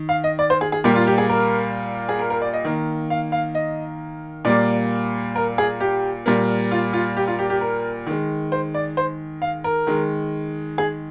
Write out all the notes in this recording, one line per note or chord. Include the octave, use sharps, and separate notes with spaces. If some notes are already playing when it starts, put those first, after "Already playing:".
Already playing: D#3
F5
D#5
D5
C5
G#4
G#4
A#2 G3 A#3 G4
F4
G4
G#4
A#4
G#4
A#4
A#4
D5
D#5
D#3 A#3
F5
F5
D#5
A#2 G3 A#3 D5
A#4
G#4
G4
A#2 G3 A#3
F4
F4
G4
F4
G4
G4
A#4
D#3 G#3
C5
D5
C5
F5
A#4
D#3 G#3
G#4